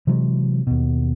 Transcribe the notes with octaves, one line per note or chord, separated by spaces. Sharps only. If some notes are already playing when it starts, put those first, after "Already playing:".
C3 E3 F#3 G#3
D#2 B2